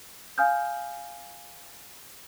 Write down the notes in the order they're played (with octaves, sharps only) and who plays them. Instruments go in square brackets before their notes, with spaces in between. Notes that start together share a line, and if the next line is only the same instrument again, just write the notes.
[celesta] F5 G#5 D#6 F6 G6